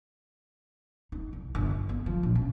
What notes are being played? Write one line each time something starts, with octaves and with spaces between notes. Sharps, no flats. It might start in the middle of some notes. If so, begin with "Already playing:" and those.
D#4
C2
G1
D3
B3
F3
A#1
C#3